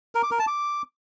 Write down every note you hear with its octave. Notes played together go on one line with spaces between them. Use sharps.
A#4
D6
A#4
A5
D6